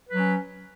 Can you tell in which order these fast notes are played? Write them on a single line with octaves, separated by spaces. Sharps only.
B4 F#3 C#4